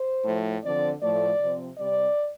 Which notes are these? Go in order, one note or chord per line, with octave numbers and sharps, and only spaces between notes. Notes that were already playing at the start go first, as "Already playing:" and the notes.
Already playing: C5
A2 F3 A3
D3 F3 C4 D5
A2 F3 A3 D5
C3 F3 C4
C3 G3 C4 D5